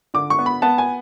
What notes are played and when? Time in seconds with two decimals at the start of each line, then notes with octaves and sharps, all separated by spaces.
0.14 D3 D6
0.30 C#6
0.39 B3
0.46 B5
0.62 B3 A5
0.78 G#5